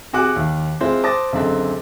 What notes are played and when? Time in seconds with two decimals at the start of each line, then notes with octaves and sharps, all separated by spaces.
0.13 C3 F#4 G#4 D6 F#6
0.36 D#2
0.81 G#3 C4 E4 F4 C5
1.03 C5 A5 D6 D#6 A6 A#6
1.33 C#2 F#2 D3 C4